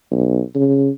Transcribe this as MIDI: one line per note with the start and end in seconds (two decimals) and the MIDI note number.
0.12 0.40 35
0.55 0.89 49